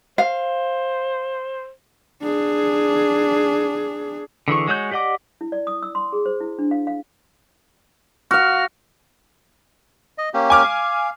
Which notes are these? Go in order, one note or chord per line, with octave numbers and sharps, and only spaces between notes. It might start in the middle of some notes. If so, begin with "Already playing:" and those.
C5 F5
D4 G#4
D3 E3 G#4 C#6
G#3 F#4 C#5 D#6 G6
G4 D5 D#5 F#5 D6
E4
D5
D#6
E6
C6
G#4
C5
E4
D4
F5
F5
F#4 F5 F6
D#5
A#3 C#4 G4
G#5 D6 F6
F5